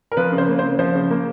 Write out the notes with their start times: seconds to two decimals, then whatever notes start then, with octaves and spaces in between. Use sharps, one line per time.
0.12 A#4
0.17 F3 B4
0.32 C#3
0.38 C5
0.48 A#3
0.59 C5
0.63 C#3
0.79 F3 C5
0.95 C#3
1.10 A#3